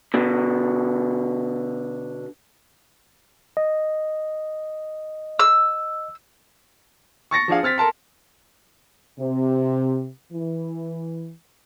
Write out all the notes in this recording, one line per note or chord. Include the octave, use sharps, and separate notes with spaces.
B2 D3
D#5
E6
C#6 A6 A#6 C#7
F3 D4 G#4 F5
C4 F6 A6 B6
A4 A#4 A5 C6
C3
E3